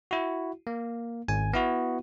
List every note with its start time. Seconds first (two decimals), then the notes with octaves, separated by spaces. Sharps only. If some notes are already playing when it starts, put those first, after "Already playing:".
0.11 E4 F#4
0.67 A#3
1.28 G#1 G#5
1.53 B3 E4 F#4